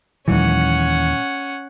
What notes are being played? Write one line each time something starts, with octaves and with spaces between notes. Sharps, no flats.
D#2 A#2 E3 F#3 G#3 C#4 F#5